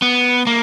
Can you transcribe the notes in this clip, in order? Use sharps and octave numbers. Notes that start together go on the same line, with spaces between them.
B3
A#3